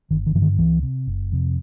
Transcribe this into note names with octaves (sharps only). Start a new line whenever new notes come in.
G1 D#3
D#3
G2 D3 E3
D#3
C#2 E3
C3
F#1
F2 C3